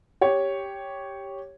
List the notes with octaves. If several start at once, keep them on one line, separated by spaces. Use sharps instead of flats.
G4 C#5